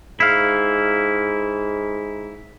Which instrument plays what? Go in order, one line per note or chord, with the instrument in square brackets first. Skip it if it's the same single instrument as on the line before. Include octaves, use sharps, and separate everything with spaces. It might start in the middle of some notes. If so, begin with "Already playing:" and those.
[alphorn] G#2 [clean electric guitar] E4 F5